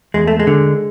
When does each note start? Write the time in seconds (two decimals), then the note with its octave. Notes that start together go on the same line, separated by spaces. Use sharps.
0.14 E2 G#3
0.27 A3
0.39 G#3
0.47 D3